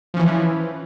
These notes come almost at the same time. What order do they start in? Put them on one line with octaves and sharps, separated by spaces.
F3 C#4 E3